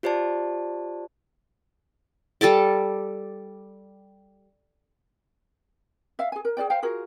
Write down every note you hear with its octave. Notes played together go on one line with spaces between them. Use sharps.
F4 G4 C5 D5 A5
G3 A4 A5 D6
E5 F5
G#4 G#5
A#4
G#4 A#4 D5 G5
C5 F5 G5
F4 F#4 G#4 A#4